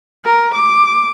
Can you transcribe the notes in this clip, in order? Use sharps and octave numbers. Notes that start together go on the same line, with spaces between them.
A#4
D6